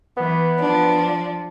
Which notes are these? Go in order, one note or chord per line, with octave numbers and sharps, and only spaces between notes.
E3 B3
F3 D4